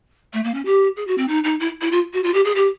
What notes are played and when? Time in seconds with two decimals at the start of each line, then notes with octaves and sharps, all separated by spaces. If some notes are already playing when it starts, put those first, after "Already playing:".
0.33 A3
0.44 A#3
0.54 C#4
0.66 G4
0.97 G#4
1.07 F#4
1.18 C4
1.28 D#4
1.44 D#4
1.60 E4
1.81 E4
1.92 F4
2.13 F#4
2.24 F4
2.34 G4
2.45 G#4
2.56 G4